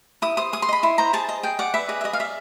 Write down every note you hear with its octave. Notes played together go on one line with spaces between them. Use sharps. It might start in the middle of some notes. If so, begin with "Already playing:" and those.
E4 D#6
C5 D#6
G#4 D#6
C6
D#5 B5
E4 C6
C5 A#5
G#4 A5
D#5
G#4 G5
D5 F#5
B4 E5
G#4 D#5
E5
G#4 D#5
F5
D5 E5